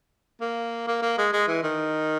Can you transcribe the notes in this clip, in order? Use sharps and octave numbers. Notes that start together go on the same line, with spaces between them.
A#3
A#3
A#3
G#3
G#3
E3
D#3